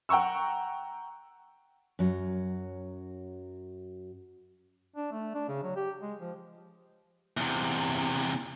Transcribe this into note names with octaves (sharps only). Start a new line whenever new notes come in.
F#5 G5 A#5 C#6 E6
F#2 F#3
D4
A3
D4
C#3
F#3
G4
G#3
F3
E2 C3